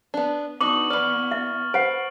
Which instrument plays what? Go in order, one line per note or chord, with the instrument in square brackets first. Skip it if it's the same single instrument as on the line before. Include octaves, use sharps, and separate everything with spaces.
[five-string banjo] B3 D4
[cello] B3 [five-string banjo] D4 D#4 F#4 [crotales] C#6 F#7 [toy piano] D6
[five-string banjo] E3 D5 [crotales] F6 F#7
[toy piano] E5 [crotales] A6
[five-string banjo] B4 [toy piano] C5 F#5 [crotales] D7